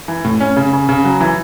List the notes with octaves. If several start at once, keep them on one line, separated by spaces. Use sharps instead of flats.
E3
A2
C#4
C#3
C#3
C#3
F#3
E3